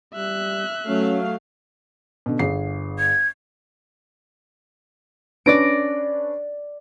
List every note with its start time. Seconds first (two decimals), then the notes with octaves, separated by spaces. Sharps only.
0.15 G3 E5 F#6
0.88 F#3 A3 C#4 F5
2.26 B2 D3
2.39 G1 G#4 C7
2.99 G#6
5.46 C#4 D4 B4 D5 A#6 D7